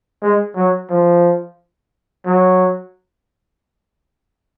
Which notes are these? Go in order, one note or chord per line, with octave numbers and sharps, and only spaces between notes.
G#3
F#3
F3
F#3